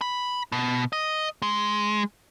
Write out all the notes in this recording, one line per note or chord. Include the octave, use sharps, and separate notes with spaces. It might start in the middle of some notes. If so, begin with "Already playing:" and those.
B5
B2
D#5
G#3